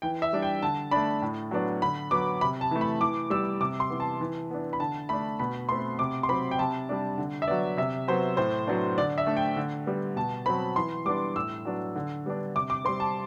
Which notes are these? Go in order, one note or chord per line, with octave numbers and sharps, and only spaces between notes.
E3 G5
E5
G3 D4
G5
D3 A5
A3 D4 B5
A2
F#3 B3 D4
D3 B5
F#3 B3 D6
C3 B5
A5
E3 A3
B5
E3 D6
G3 B3 E6
C3 D6
C6
E3 B3
A5
E3
B3 D4
B5
D3 A5
A3 D4 B5
B2 B5
A3 C4 C6
C3 D6
C6
F#3 C4 B5
G5
C3 A5
G3 D4
D3
E5
F#3 B3 D5
C3 E5
F#3 B3 C5
A2 C5
F#3 B3 D4
D3 D5
E5
A3 D4
G5
D3
G3 B3
B2 A5
F#3 C4 B5
E3 C6
G3 B3 D4 D6
A2 E6
F#3 B3 D4
D3
G3 B3 D4
C3 D6
D6
G3 C4 C6
A5